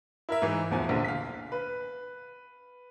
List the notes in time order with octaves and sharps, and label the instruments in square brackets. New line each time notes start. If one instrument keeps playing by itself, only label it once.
[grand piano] E4 A#4 E5
G#2 E3
D1 E2 F3 G#5
E1 A#1 D3
F5 B6
B4